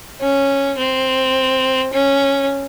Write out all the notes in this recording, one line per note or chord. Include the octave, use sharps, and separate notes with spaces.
C#4
C4
C#4